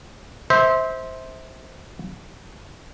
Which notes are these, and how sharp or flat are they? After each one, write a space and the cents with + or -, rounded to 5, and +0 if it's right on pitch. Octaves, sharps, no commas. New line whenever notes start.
C5 +0 E5 -30